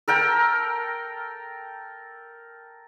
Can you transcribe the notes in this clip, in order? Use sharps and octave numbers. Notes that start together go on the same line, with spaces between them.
A4 A#4 G5